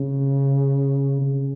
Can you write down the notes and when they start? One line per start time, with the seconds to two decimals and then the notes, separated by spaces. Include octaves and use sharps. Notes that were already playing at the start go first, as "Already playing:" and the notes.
Already playing: C#3
1.21 C#3